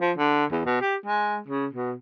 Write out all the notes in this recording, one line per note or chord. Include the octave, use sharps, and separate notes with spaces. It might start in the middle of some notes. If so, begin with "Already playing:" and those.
F3
D3
E2
B2
G4
G#3
C#3
B2